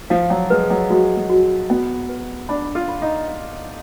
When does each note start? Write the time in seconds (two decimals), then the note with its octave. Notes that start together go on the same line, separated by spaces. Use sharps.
0.10 F3 F5
0.30 F#3
0.50 G#3 B4
0.70 F#3
0.90 G#3 F#4
1.16 G#3
1.30 F#4
1.70 B3 F#4
2.09 B4
2.49 D4 B5
2.75 F4
2.88 B5
3.02 D#4
3.28 F5